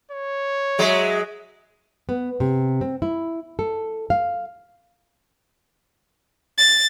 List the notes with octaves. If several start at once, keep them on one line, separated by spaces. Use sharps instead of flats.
C#5
F#3 G#3 E5
B3
C3
C4
E4
A4
F5
A6